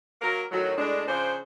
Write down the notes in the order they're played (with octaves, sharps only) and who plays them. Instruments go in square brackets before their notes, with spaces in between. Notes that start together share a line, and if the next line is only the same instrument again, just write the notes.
[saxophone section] F#3 A#3 A#4
A2 D#3 F#3
A2 G#3 D4
C#3 F3 D4 C5